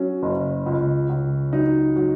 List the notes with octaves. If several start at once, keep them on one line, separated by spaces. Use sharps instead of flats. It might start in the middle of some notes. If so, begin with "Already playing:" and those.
Already playing: F#3 C#4
F#1
C#2
C#2
F#3 D#4
F#3